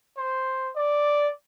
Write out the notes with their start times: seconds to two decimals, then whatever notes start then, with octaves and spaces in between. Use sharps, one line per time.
0.18 C5
0.76 D5